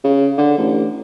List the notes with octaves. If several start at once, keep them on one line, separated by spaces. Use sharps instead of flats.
C#3
D3
A1